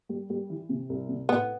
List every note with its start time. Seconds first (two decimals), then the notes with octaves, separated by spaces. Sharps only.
0.09 G3
0.30 G3
0.50 E3
0.69 C3
0.89 C2
1.09 C3
1.29 A2 B3